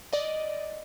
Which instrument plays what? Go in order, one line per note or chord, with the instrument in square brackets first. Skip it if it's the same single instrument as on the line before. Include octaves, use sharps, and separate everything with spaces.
[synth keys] D5 D#5